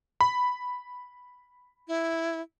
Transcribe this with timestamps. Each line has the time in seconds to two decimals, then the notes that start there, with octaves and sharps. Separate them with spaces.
0.21 B5
1.88 E4